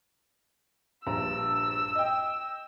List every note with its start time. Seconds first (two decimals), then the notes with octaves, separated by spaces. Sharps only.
1.07 A#1 G2 A#5 E6
1.95 D#5 G5